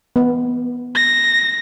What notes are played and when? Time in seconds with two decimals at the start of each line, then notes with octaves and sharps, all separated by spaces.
0.16 B3
0.95 A#6